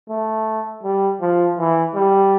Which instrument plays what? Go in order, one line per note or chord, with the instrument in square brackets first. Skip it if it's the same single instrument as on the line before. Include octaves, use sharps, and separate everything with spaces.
[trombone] A3
G3
F3
E3
G3